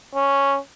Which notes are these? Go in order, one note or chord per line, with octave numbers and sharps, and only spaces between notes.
C#4